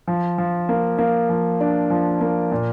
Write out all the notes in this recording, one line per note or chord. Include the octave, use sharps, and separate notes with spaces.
F3
F3
A#3
A#3
F3
D4
F3
A#3
A#2